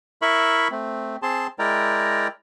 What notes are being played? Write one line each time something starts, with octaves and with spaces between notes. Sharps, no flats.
E4 A#4 E5 B5 C#6
A3 C4
C4 G#4 A5 C6
G#3 E4 A#4 D5 G5 A#5